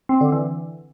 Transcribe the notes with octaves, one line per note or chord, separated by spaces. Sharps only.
C4
D3
E3